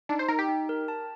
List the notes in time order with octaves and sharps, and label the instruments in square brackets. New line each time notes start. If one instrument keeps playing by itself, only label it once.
[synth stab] D4 [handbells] D#4
[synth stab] C5
[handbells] D#4 [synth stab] A#4
[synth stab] G4
[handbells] D#4
A#4
A5